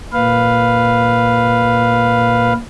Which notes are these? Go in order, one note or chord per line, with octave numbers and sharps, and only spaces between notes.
A#2 B4 F5